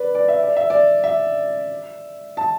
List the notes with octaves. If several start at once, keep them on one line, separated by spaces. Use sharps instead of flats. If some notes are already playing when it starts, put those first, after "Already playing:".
Already playing: B4 D5
D5
E5
D5
E5
D5
E5
A5